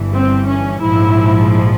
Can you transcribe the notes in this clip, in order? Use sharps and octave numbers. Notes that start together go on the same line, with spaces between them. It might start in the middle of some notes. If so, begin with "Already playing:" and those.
Already playing: G1 G2 E3
C4
C#4
A#1 G#2 F3 E4